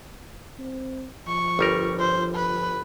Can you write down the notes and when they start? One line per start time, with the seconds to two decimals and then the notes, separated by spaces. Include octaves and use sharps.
0.59 C4
1.27 F3 C#6
1.59 G1 G3 A#4
1.99 C5
2.35 B4